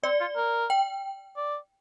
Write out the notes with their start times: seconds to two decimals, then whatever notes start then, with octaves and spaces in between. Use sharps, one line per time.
0.03 C4 D5
0.20 F4
0.36 A#4
0.70 G5
1.37 D5